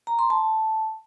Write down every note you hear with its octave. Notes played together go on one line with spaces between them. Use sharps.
A#5
C6
A5